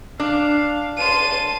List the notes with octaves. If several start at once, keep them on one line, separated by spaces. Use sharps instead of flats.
D4 F5
A5 C6 D#7